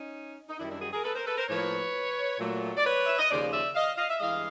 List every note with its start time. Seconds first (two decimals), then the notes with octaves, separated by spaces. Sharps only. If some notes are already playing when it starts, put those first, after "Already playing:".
Already playing: C#4 D#4
0.49 D#4
0.58 F#2 D#3 G3 D4 E4
0.70 D4 E4
0.81 F#4 G#4
0.93 G#4 A#4
1.03 A4 B4
1.15 A#4 C5
1.26 A4 B4
1.37 A#4 C5
1.49 A2 F3 A#3 B4 C#5
2.40 A#2 F#3 A3
2.77 D5
2.85 B4 C#5
3.06 E5
3.19 D#5
3.29 D#2 C#3 F3 C5 D5
3.53 D5 E5
3.75 D#5 F5
3.98 D#5 F5
4.09 E5
4.20 G2 E3 G#3 D#5 F5